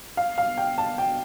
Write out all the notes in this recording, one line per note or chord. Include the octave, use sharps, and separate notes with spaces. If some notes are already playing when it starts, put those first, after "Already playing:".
F5
F5
G5
A5
G5